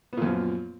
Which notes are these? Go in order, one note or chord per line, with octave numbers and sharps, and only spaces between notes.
F#2 A#2 F3 B3